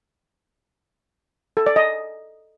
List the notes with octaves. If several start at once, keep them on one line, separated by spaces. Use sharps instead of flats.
A4
D5
D#5